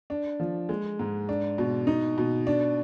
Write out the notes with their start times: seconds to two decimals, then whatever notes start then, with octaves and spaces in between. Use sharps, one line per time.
0.10 D4
0.40 F3
0.69 G#3
0.99 G#2
1.29 D4
1.58 B2
1.87 D#4
2.18 B2
2.47 D4